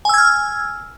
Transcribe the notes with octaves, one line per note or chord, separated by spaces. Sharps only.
G#5 E6 F6 G#6